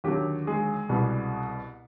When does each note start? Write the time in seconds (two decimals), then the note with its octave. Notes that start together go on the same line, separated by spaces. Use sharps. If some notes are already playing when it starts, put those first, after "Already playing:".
0.04 D#2 D3 F#3 G4
0.47 G#3 G#4
0.89 C2 B2 G3